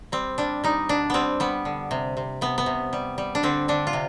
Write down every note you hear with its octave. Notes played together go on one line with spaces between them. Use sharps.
G3 C4
G3 D4
G3 D#4
B2 D4
G3 B3 C4
G3 B3
D3
C3
C3
C3 B3
B3
C3
G3
G3
D4
D3 C4
D3 D4
F4
C3